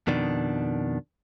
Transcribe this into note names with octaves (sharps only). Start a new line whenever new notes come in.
F2 B2 D#3 D4